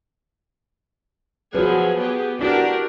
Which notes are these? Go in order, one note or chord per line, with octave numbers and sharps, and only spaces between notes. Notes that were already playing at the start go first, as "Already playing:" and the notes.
F3 F#3 F#4 G#4 B4
B3 G4 G#4
D4 E4 F#4 G4 A#4